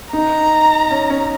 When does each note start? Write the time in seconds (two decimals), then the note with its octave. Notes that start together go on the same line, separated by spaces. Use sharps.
0.13 D#4 A#5
0.91 C#4
1.10 C#4